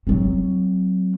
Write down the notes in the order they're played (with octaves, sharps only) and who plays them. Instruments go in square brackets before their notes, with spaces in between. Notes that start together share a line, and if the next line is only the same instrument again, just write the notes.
[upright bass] F#3 C4